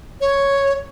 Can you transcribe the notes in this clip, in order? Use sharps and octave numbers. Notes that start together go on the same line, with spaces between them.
C#5